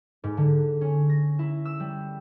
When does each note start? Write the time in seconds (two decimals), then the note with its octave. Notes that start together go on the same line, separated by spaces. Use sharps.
0.24 G#2
0.37 D3
0.81 C#4
1.09 A#6
1.39 E4
1.65 E6
1.80 G3